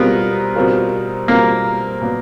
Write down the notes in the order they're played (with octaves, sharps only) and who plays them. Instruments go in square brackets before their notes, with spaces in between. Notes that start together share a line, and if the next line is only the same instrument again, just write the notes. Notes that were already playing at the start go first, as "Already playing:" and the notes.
Already playing: [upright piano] B2 G3 C4 F4 A#4 [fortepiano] B3
[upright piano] B2 G3 C4 F4 A#4
[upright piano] B2 G3 C4 F4 A#4 [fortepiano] A#3
[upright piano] A#2 F#3 B3